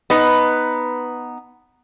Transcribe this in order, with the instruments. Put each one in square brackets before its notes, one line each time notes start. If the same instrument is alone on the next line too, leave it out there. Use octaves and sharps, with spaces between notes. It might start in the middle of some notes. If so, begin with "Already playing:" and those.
[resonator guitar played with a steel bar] B3 D#4 B4